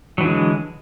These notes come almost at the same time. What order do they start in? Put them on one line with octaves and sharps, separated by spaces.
F#3 E3 D3 G#3